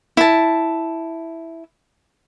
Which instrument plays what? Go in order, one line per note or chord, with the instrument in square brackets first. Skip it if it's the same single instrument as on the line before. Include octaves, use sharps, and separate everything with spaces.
[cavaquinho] E4 A5